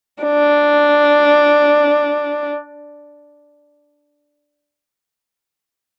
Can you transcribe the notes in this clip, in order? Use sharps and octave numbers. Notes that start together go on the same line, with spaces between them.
D4